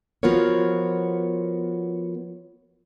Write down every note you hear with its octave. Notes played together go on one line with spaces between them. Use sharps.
F3 B3 F4 F#4 A#4 C#5